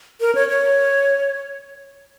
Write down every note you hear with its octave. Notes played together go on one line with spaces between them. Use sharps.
A#4
C#5
C#5